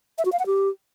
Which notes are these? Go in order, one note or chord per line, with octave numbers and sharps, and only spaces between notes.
E5
F#4
F5
F#5
G4